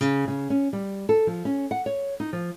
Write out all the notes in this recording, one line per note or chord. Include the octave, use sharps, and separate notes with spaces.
C#3
C#3
C#4
G3
A4
F3
C#4
F#5
C#5
D#4
F3